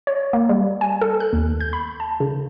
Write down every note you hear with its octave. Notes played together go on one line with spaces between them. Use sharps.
C#5
A#3
G3
G#5
A4
F#6
D#2
G6
B5
A5
C#3